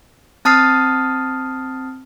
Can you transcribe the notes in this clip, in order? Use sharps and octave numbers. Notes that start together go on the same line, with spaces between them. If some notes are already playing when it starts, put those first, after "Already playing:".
C4 A5 D#6 F6 A6 C7